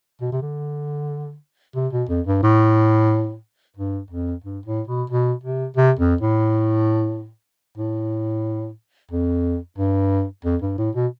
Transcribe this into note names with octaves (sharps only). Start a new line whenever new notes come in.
B2
C3
D3
C3
B2
F2
G2
A2
G2
F2
G2
A2
B2
B2
C3
C3
F2
A2
A2
F2
G2
F2
G2
A2
B2